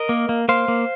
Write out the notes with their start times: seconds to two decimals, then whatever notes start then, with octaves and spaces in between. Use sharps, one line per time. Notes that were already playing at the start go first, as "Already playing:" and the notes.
Already playing: A#4 D#5
0.09 A#3
0.29 A#3
0.49 A#3 C5 F5
0.68 A#3